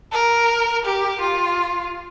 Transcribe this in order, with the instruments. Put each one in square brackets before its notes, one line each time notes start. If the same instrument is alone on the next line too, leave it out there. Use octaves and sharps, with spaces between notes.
[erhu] A#4
G4
F4